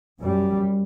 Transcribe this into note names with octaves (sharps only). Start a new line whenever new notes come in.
F#2 G3